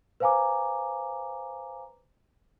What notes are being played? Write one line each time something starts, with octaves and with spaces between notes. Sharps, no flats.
B4 C5 F5 G#5 A#5 D6